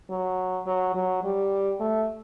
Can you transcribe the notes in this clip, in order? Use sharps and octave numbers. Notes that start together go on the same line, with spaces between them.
F#3
F#3
F#3
G3
A3